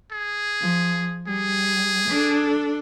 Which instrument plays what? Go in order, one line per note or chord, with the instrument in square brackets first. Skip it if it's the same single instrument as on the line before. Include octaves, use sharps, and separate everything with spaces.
[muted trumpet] G#4
[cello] F3
[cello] G3 [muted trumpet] G#4
[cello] D4 A4